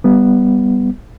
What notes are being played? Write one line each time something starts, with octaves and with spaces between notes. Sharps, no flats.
G3 B3